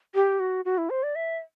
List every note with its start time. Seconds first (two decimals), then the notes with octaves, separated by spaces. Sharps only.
0.15 G4
0.40 F#4
0.65 F#4
0.78 E4
0.90 C5
1.03 D5
1.15 E5